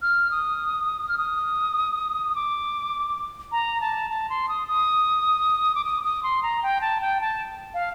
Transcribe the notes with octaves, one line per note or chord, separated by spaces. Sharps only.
F6
D#6
F6
D#6
D6
A#5
A5
A5
C6
D#6
D#6
D6
D#6
D#6
C6
A#5
G5
A5
G5
A5
F5